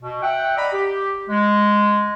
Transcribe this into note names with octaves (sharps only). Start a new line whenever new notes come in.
B2
E5 F#5 G5
D5 D#5 F#5 A#5 B5
G4
G#3